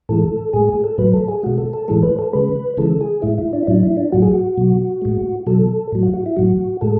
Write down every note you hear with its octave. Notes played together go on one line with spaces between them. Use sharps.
A2 E3 G#3 A4
A2 G#3 G#4
G#4
A4
A2 F#3 B4
A4
G#4
B2 G#3 F#4
A4
A4
A2 E3 G#3 A4
B4
A4
C#3 G#3 B4
C#3 E3 G#3 A4
G#4
A2 G#3 E4
E4
D4
E4
A2 F#3 D4
E4
D4
A2 F#3 F#4
G#4
F#4
B2 F#3
A2 G#3
B2 F#3 A4
A2 F#3
F#4
F#4
E4
A2 F#3 F#4
A2 G#3 A4